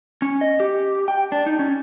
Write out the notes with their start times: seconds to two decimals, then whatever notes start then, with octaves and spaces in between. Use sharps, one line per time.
0.22 C#4
0.41 D#5
0.60 G4
1.08 G5
1.32 D4
1.46 D#4
1.59 C#4